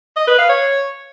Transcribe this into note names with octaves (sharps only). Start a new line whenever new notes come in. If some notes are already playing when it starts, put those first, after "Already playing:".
D#5
B4
F5
C#5